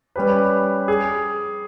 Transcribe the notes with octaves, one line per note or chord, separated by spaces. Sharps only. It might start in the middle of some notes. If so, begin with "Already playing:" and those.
G3 C#4 G4 B4
G#4